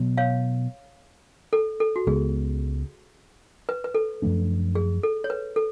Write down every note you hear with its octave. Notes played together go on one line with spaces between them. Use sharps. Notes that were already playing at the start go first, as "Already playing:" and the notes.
Already playing: B2 F#3 B3
C#5 F5
A4
A4
F#4
C#2 C#3 G#3 B3 G#4
B4
B4
A4
F#2 F3 A3 D4
G#4
A4
C#5
B4
A4